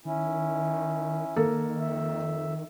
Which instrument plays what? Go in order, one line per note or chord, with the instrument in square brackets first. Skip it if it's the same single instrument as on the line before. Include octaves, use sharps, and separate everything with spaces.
[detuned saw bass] D#3 [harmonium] C#4 E4
[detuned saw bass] D#3 [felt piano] A#3 A4
[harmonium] F2 E5